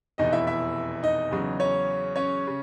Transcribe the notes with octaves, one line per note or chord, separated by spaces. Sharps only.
F1 E2 B2 D#4 D#5
E4 E5
E4 E5
D#4 D#5
E2 C#3 F#3
C#4 C#5
C#4 C#5
C#3